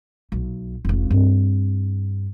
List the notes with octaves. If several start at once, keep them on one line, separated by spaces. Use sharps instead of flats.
B1
F1 C#2
G2 C4